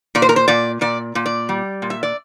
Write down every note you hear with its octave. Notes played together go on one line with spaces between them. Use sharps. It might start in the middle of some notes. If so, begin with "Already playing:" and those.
A#2 D5
C5
A#4
C5
A#2 D5
A#2 D5
A#2
D5
G3
A#2
E5
D5